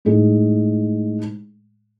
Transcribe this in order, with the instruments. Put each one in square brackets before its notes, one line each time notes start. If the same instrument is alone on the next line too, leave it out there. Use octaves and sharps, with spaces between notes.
[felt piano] A2 G#3 D#4 G#4